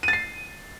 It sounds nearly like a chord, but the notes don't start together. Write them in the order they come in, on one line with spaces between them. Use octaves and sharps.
D#7 A6 C7